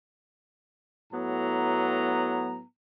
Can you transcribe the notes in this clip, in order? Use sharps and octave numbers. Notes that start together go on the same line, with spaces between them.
A2 F#3 B3 A#5